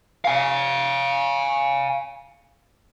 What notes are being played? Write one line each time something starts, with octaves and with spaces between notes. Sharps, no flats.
F5 G#5